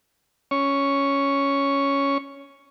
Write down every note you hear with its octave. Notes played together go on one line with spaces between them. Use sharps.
C#4 C#6